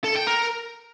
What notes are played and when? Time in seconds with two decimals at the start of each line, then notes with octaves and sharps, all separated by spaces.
0.04 A4
0.15 G5
0.27 A#4